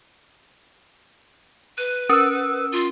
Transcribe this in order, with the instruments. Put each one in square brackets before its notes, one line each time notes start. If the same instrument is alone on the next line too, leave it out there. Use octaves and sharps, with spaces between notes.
[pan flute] B4 [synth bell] F#6 D#7
[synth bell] C#4 A#4 [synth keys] D#6 E6
[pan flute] F4